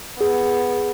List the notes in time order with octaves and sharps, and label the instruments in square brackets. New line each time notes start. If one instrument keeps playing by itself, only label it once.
[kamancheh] B3 [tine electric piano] G#4